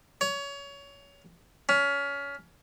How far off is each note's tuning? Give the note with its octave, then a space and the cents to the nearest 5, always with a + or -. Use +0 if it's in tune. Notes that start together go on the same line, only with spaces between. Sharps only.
C#5 +25
C#4 +25